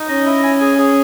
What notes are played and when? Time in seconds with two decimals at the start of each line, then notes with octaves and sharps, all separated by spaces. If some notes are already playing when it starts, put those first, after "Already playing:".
Already playing: D#4
0.08 C#4 D#5
0.26 E4
0.44 G#5
0.61 G#4
0.78 G#4